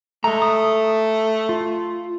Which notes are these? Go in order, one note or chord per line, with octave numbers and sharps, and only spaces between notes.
G#3 A3 A#5
D#6
F4